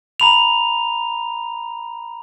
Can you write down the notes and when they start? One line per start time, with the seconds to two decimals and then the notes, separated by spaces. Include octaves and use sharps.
0.20 A#5 B5 F7